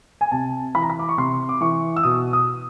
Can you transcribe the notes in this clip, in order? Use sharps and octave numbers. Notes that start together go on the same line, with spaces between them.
G#5
C3 A5
E3 B5
A#5
B5
D6
C#6
C3 C6
D6
E3 C#6
E6
B2 D#6
D#6